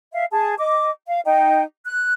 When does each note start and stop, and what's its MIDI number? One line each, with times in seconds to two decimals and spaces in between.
0.13 0.25 76
0.13 0.25 77
0.31 0.54 68
0.31 0.54 81
0.59 0.90 75
0.59 0.90 86
1.06 1.19 77
1.25 1.63 63
1.25 1.63 79
1.84 2.13 90